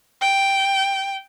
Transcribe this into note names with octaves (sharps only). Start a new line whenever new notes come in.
G5